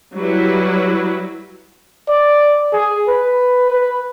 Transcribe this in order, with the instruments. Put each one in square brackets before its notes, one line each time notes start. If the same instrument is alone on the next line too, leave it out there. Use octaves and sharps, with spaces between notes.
[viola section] F#3 G3 E4 B4
[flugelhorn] D5
G#4
B4
B4